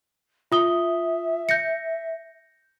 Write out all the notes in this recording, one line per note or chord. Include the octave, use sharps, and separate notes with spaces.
F4 E5 D#6 G7
G6 A#6 C#7